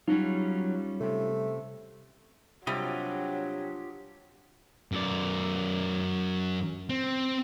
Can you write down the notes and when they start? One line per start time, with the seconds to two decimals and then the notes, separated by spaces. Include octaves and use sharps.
0.08 F#3 G3 C#4 D#4 F4
1.01 C3 A3
2.67 C3 F#3 G3 D4 F4 G4 D#5
4.92 F#2 D5
6.90 C4